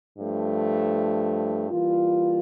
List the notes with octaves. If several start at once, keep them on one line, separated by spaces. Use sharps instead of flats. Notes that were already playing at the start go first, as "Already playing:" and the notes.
G2 F3 A3
E3 G3 A#3 F4